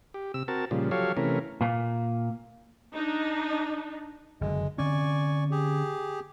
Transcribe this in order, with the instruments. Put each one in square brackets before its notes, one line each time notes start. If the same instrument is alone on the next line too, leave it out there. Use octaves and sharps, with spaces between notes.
[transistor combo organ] G4
C3 E6
C4 F#4 A#4 A5
A#2 C#3 F3 G3
F3 F#3 G4 A4 C#5 F5
C3 E3 A3 C#4 A#4
[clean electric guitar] A#2 A#3
[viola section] D4 D#4
[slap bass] F#1 D3 [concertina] G#3
[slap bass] D3 C4 C#4 [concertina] D5 G#5 C#6
[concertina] G4 G#4